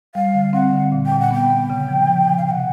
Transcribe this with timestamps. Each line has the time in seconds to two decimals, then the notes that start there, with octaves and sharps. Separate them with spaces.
0.15 G3 F5
0.34 D3
0.53 C4 F#5
0.73 D3
0.92 A#2
1.06 G5
1.12 A#2
1.20 F#5
1.31 B3 G5
1.50 B3
1.70 C#3
1.88 F3
2.07 F3
2.28 F3
2.38 F5
2.47 C3 F#5 G5